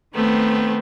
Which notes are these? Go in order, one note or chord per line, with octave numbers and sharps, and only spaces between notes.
D#3 A3 B3 C4